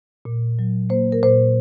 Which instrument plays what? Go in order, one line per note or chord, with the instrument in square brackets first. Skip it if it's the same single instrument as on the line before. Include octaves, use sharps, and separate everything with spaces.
[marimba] A#2
F#3
A#3 C5
A#4
A#2 C5